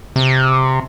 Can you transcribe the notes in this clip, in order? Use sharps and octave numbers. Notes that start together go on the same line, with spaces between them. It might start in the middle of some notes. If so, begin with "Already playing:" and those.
C3